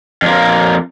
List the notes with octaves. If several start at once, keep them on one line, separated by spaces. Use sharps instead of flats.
F2 A#3